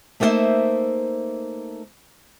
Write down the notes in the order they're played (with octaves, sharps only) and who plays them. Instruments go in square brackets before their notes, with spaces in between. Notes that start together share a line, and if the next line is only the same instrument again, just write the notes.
[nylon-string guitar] A3 A#3 D#4 F#4 C5 E5